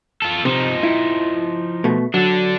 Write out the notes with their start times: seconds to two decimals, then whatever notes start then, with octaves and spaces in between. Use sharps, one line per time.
0.22 F4 A4
0.45 C3 F3 D#4
0.83 E4
1.84 B2 A3
2.14 F#3 D4 A4